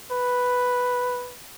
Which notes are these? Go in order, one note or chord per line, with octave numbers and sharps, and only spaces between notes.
B4